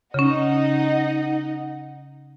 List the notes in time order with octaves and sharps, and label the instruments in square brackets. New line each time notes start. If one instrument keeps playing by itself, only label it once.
[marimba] C#3 C#4 [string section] D#4 D#5 F#5